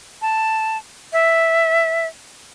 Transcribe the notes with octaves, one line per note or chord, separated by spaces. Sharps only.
A5
E5